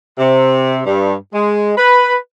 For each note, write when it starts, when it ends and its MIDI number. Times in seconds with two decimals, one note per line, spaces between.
0.18 0.81 48
0.86 1.15 43
1.34 1.72 56
1.77 2.15 71